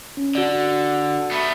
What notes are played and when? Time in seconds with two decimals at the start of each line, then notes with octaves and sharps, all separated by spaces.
0.17 C#4
0.35 D3 F#4 D5
1.31 A3 B3